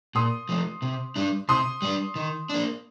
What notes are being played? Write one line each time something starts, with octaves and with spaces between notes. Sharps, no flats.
A#2 C6 D#6
F3 A3
C3
G3 D4
C3 C6 D#6
G3 D4
D#3
A#3 D4